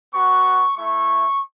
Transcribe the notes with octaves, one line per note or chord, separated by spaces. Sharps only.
B3 F#4 C#6
A3 E4 C#6